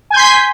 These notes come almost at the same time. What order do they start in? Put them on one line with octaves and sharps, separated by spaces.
G#5 G6 C6 B6